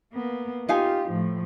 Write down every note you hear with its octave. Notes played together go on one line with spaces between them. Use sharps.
A#3 B3
D#4 F4 G4 F5 G#5
A2 F3